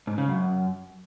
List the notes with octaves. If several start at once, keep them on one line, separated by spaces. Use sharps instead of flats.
G#2
C#3
F#2